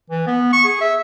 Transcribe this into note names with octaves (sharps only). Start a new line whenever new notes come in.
E3
B3
C#6
G#4
E5